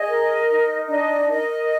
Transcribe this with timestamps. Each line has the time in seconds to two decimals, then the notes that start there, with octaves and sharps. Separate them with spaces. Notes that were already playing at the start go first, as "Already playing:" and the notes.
Already playing: G#4 D#5
0.08 A#4
0.48 D#4
0.88 D4 D#5
1.29 A#4 D#5